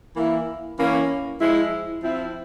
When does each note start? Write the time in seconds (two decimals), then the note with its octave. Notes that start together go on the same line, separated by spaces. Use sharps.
0.14 E3 A#3 E4
0.77 E3 A#3 C#4
1.40 F3 G#3 E4
2.02 F3 C4 E4